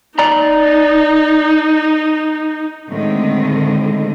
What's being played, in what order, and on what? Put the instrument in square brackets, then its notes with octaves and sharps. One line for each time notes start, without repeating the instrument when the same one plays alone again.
[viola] D#4 [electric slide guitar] D5 A#5
[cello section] A2 D3 D#3 G#3 C4